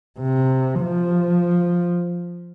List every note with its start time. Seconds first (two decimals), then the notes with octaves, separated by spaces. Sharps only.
0.19 C3
0.81 F3